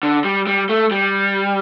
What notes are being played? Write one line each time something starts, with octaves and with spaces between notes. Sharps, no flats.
D3
G3
G3
A3
G3